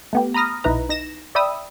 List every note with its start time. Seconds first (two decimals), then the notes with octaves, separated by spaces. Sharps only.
0.13 A3 B3 G4
0.34 A#5 B5 D#6 F6 A#6
0.64 B1 D#4 E4 B4 A#5
0.89 D#4 A#6 E7
1.35 D5 E5 G5 B5 D#6 E6